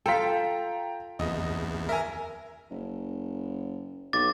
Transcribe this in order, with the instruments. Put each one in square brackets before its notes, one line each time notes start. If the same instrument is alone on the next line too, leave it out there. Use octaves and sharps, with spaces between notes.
[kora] F4 A4 [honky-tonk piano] G5 A#5 B6
[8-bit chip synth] E2 [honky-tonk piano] D#5
[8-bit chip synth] A#4 [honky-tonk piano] E5 G#5
[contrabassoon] F#1
[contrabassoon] B1 [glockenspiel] D6 A6